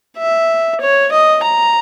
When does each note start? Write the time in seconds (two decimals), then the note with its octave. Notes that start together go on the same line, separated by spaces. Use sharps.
0.17 E5
0.81 C#5
1.12 D#5
1.43 A#5